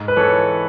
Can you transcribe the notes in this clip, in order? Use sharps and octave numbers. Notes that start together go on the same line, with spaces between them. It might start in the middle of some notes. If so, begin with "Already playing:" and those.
Already playing: G#2
B4
E3 A4 C#5